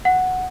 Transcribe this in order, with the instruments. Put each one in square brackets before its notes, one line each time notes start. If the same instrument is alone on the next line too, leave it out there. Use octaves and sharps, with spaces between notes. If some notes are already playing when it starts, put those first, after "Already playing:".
[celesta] F#5